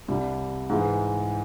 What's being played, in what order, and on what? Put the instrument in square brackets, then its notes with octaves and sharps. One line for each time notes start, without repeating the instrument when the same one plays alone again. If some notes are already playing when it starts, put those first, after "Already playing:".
[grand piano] C2 C3 G3
G#2 E3 G#3